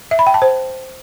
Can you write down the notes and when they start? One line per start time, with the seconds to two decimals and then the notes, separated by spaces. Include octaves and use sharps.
0.11 E5
0.19 B5
0.27 G5
0.34 A5
0.42 C5